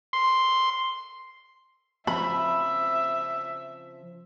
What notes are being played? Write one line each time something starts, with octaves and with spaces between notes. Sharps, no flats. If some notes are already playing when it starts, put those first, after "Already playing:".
C6
C#3 F3 C4 E5 B5